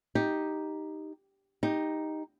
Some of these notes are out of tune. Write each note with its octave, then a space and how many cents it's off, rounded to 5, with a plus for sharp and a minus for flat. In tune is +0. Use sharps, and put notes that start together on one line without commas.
D#4 +0 G4 +0
D#4 +0 G4 +10